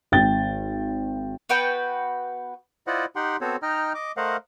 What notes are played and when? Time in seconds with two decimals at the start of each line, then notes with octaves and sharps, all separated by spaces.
0.12 G#1 G5 A6 G7
1.49 B3 F#4 B4 G5
2.87 E4 F4 C5 D5 D#5 F#5
3.16 D#4 G4 F#5 G5 C6
3.41 B3 C4 F#4 A4 C5 C#5
3.63 D#4 D#5 G5 A#5 F6
3.95 D#5 D6
4.17 A3 A#4 C5 D#5 F5 F#5